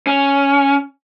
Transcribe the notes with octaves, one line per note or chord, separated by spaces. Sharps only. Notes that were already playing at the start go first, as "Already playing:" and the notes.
C#4